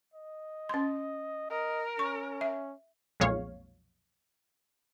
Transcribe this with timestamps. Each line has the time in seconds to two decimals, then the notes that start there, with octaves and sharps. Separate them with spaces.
0.14 D#5
0.69 C#4 C6
1.50 A#4 D#5
1.99 C#4 C#6
2.41 E5
3.20 B1 F2 A#2 G#3 C#5 F5